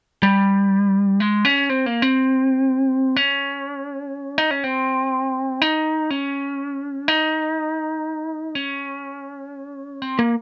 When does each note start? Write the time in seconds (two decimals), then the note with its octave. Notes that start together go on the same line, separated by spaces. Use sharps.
0.23 G3
1.20 G#3
1.45 C#4
1.69 C4
1.86 A#3
2.02 C4
3.16 C#4
4.38 D#4
4.51 C#4
4.64 C4
5.62 D#4
6.10 C#4
7.08 D#4
8.55 C#4
10.02 C4
10.19 A#3